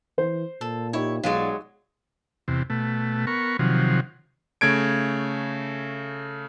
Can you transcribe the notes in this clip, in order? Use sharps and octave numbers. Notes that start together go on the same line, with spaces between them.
E3 C5
A#2 A4
D#4 E4 G4 C#5
B1 F#3 G#3 F4 F#4 D5
E2 C3
B2 A3
B3 A#4 C#6
C3 D#3 F3 F#3
C#3 A3 G#6 D7